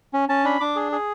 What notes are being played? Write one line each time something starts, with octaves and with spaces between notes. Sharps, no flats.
C#4
C#4 A5
D4 B5
D4 D6
G#4
G#4